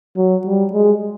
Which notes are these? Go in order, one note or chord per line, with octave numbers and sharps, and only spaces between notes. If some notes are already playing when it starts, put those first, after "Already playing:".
F#3
G3
G#3